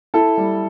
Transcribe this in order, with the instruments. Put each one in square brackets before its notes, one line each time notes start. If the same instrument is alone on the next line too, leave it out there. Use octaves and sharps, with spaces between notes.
[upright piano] E4 [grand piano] A4
[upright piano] G3